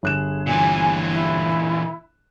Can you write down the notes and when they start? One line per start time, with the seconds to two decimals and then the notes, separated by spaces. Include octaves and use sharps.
0.03 G1 G#4 F#6 E7
0.47 A#2 E3 G#5
1.12 E4